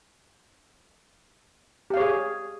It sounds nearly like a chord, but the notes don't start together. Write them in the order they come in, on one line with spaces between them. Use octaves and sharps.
G4 F5 C#5 G#4